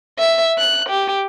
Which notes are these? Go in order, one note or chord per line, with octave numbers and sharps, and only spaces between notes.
E5
F#6
G4